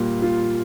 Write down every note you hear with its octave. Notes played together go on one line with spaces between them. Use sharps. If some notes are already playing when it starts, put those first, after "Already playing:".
Already playing: A#2 G3
F4